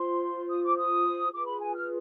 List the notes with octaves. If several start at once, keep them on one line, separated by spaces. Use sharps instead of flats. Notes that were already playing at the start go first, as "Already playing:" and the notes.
Already playing: F4 C5 C6
D#6
D6
D#6
F4 G#4 B4 D6
B5
G#5
F6